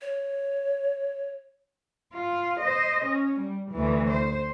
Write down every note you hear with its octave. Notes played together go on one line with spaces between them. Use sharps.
C#5
F4
C5 D#5
C#4
G3
D2 E3
C5